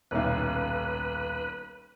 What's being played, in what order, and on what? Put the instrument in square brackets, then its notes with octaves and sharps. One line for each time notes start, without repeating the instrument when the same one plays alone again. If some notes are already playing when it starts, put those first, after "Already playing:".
[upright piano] D#1 B1 [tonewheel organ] B4